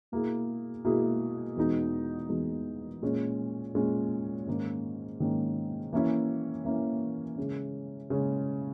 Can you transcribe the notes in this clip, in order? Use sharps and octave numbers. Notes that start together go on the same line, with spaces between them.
B2 A#3 E4 G#4
B2 A#3 E4 G#4
E2 B2 G#3 B3 D#4
E2 B2 G#3 B3 D#4
A#2 G#3 C#4
A#2 G#3 C#4
G#2 D#3 A#3 C#4
G#2 D#3 A#3 C#4
E3 A#3 C#4 E4
E3 A#3 C#4 E4
C#3 G#3 C#4
C#3 G#3 C#4